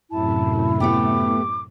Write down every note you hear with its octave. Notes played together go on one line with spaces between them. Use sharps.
F#2 A2 C3 E4 A5
A3 B3 G4 D6